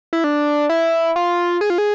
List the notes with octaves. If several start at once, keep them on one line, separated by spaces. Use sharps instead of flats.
E4
D4
E4
F4
G#4
F4
G#4